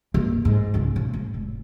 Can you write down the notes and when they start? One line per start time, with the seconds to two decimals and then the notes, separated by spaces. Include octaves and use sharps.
0.14 G2 A#3
0.45 G#2
0.74 C#2 B3
0.96 B1
1.14 G#2
1.34 F1